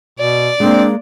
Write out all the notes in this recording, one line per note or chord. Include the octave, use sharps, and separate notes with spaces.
B2 D5
G#3 A#3 C4 D4